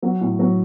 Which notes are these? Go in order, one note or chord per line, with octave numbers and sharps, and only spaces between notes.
F#3 F#4
A2
F#3